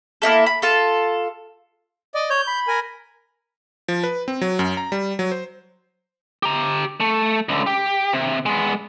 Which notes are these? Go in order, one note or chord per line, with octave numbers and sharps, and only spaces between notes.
A#3 D#4 E4 A4
B5
F4 A4
D5 D#5
C#5 G6
B5
A#4 G#5
F3
B4
C4
F#3
F#2
A#5
G3
F#3
C5
G4 A#5
A3
C#2 D3
G4
C3
G#3 B3